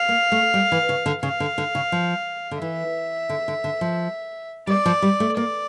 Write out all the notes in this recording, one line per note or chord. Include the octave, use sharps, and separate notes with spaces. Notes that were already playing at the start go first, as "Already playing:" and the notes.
Already playing: F5
A#3
A3
G3
E3
C#3
D3
C#3 F5
D3
D3
C#3
F3
D3
E3 E5
D3
D3
D3
F3
G3 D5
F3
G3
A3
A#3 D5